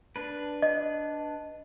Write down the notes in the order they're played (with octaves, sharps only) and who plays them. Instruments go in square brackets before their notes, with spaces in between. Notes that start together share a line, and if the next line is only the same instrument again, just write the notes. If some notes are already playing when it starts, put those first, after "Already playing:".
[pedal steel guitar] D4 B4
[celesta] D#5